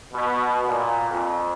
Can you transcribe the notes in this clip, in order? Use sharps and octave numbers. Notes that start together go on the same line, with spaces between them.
B2
A#2
F2